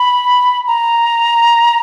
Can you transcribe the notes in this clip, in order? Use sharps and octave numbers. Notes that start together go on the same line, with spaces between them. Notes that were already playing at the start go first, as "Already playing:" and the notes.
Already playing: B5
A#5